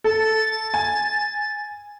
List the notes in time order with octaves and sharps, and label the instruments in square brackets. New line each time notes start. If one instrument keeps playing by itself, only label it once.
[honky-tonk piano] A4 [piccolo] A6
[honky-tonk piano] G#5